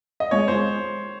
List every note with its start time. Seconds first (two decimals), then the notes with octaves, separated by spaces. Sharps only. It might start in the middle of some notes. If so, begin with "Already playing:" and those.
0.20 D#5
0.31 G#3 C#5
0.48 G#3 C5